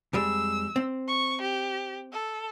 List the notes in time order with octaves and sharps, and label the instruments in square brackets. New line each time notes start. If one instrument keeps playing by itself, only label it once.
[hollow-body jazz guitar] F2 G3 G#3 [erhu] E6
[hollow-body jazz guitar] C4
[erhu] C#6
G4
A4